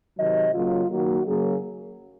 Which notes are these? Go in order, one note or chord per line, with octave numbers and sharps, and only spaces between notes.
C3 D#3 F#3 D#5
C#3 F#3 A#3 F4
D#3 F#3 A#3 F#4
C#3 F#3 A#3 G#4